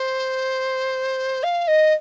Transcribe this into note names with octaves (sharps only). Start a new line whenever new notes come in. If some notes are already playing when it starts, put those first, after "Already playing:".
Already playing: C5
F5
D#5